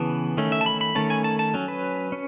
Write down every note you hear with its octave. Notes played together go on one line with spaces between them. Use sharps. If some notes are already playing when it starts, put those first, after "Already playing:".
Already playing: C#3 E3 B3 A5
D#3 A3 C#4
E5
A5
B5
B5
D#3 A3 C#4 A5
G#5
A5
A5
F#3 C#4
B4
C#4